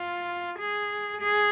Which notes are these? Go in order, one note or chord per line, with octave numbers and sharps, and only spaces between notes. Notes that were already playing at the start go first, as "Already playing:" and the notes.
Already playing: F4
G#4
G#4